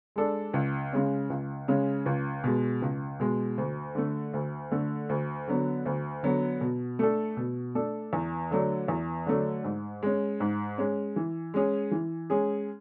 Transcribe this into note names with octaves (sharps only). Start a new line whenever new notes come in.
G#3 D4 A4
C#2
C#3 G#3 C#4
C#2
C#3 G#3 C#4
C#2
B2 G#3
C#2
B2 G#3
D2
D3 A3
D2
D3 A3
D2
D3 F#3 B3
D2
D3 F#3 B3
B2
A3 D4 A4
B2
A3 D4 A4
E2
D3 F#3 A3 D4
E2
D3 F#3 A3 D4
G#2
G#3 C#4
G#2
G#3 C#4
E3
G#3 C#4 G#4
E3
G#3 C#4 G#4